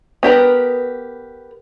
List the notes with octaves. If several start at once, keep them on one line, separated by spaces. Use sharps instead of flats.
B3 G4 A#4 B4